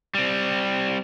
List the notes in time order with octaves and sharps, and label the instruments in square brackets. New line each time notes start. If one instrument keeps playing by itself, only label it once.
[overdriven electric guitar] G3 C4